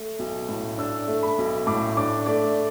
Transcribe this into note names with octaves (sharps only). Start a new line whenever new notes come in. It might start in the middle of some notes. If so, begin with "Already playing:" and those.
Already playing: A3
B1
A2
D4 E6
A3
B5
B1
A2 D6
D4 D6
A3 D5